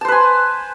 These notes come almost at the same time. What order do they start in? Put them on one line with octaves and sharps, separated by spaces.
A5 C5 B4 G#5